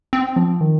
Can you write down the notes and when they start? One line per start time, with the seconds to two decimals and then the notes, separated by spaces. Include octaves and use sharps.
0.13 C4
0.36 F3
0.61 D#3